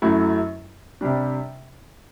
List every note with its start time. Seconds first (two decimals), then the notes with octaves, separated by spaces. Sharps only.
0.02 F#2 F#3 A3 E4
1.01 C3 G3 D4